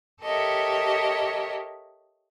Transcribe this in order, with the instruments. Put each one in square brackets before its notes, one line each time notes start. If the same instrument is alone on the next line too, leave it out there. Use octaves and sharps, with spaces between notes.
[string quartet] G4 A4 A#4 C#5 D#5 E5